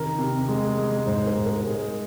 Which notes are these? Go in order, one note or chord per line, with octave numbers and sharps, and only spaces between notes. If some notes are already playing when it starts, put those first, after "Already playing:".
Already playing: C3 D#3 A#4
C3
G#3
G#3
G#2 C5
A#4
G#2
A#4
A#4
G#3 G#4